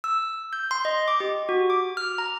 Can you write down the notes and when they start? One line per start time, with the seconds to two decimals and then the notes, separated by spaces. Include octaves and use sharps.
0.04 E6
0.53 G6
0.71 C6
0.85 D#5
1.08 D6
1.20 G4
1.49 F#4
1.70 D6
1.97 F6
2.18 A#5